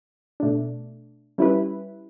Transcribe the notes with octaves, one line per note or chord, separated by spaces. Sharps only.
B2 A3 D4
G3 C#4 E4 B4